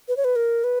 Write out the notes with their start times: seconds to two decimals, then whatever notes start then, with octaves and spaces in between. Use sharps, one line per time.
0.08 B4
0.17 C#5
0.24 B4
0.36 A#4
0.64 B4